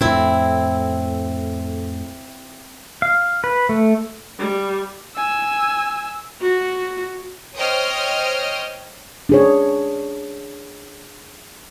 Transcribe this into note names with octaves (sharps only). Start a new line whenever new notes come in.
F2 A2 C4 E4
F5
B4
A3
G3
G#5 E6
F#4
C5 C#5 D#5 G5 D#6 F6
D4 G#4 C#5